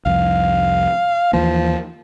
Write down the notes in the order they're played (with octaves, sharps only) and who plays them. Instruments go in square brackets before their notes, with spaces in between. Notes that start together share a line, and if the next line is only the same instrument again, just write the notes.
[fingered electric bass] C2 F2 [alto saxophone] F5
[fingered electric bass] D#2 E3 A#3 [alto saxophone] F3